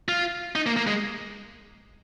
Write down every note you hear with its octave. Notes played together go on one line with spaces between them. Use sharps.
F4
D#4
A#3
A#3
G#3